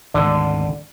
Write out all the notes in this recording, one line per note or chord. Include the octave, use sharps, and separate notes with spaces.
G#1 D2 B2 D3 D5